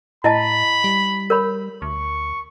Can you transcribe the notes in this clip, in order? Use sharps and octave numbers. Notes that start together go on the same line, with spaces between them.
A2 E4 D#5 A5 B5
G3
A#4 C#5 B5
D2 C#6